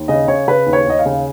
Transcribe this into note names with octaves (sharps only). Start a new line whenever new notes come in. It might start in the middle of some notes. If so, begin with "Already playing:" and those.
Already playing: D#2
C#3 D#5
C#3 C#5
C#3 B4
D#2
C#5
D#2 D#5
F5
C#3